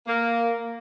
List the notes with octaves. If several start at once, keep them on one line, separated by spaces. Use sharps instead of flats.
A#3